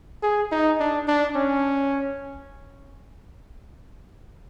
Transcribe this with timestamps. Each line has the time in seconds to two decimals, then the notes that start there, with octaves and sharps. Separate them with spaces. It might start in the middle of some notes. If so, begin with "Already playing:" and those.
0.23 G#4
0.52 D#4
0.80 D4
1.07 D4
1.35 C#4